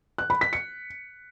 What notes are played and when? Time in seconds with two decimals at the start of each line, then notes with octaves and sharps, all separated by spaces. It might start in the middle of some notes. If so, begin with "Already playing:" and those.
0.18 F#6
0.30 B5
0.41 B6
0.53 C#7